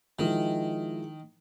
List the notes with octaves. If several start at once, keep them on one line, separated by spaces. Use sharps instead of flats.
D#3 F3 G#3 E4